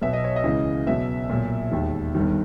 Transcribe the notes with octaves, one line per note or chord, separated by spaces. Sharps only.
B1 B2 E5
D#5
C#5
D#5
C#2 C#3 E3
B1 B2 E5
B1 A#2
E1 D#2 D#3
G1 G2 D#3